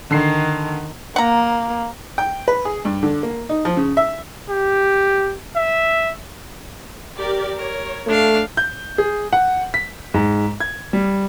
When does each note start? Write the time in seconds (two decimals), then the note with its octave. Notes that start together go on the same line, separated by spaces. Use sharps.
0.11 D3 D#3 C7
1.16 A#3 F#5 A#5
2.18 G5
2.48 B4
2.65 G#4
2.85 G2
3.03 D3
3.23 A#3
3.49 D#4
3.65 F3
3.77 C#3
3.97 E5
4.50 G4
5.56 E5
7.17 G4 A#4 D5
7.56 A#4 C#5
8.07 A3 D4 F5
8.57 G6
8.98 G#4
9.33 F#5
9.74 B6
10.14 G#2
10.60 G#6
10.93 G3